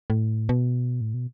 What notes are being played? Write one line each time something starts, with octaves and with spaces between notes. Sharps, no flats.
A2
B2
A2
B2